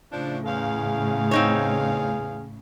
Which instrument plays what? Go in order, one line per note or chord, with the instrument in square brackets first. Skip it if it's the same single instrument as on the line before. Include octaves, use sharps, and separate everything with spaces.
[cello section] A2 C#3 [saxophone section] F3 D4
[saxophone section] E2 F5 [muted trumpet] G#4
[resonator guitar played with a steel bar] C4 D#4 C#5